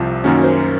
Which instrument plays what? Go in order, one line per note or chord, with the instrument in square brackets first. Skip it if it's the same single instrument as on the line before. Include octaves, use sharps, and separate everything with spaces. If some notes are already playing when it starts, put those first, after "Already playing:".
Already playing: [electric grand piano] C2 C3 F3 [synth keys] F4
[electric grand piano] F#2 D#3 A#3 C#4 [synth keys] F#4
[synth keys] C5